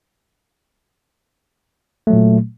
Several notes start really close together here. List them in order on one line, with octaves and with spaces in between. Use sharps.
A3 F#3 A#2